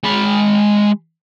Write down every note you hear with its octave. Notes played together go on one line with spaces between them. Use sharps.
G#3 B5